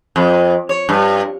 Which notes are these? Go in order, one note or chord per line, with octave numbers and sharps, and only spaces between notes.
F2
C#5
G2